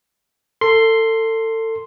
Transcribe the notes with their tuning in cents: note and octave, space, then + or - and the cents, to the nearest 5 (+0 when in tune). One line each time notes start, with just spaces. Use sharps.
A4 +30 C6 +0